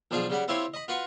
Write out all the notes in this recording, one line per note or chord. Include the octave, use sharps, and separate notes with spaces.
B1 F3 D4 F4 G#4 F5
C#3 G3 F#5 B5
C4 E4 F4 G4 C#5 C6
D#5 B5
F4 F#4 B4 F5 C#6